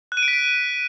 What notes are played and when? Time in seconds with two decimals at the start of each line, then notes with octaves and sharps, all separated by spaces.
0.12 F#6
0.17 D#7
0.23 D7
0.28 B6
0.33 D7